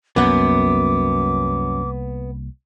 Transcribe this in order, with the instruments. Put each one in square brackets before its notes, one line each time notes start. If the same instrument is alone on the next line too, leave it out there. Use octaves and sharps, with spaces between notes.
[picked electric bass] C2 A#3 [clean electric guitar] F#2 [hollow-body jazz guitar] B3 F#5 [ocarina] D6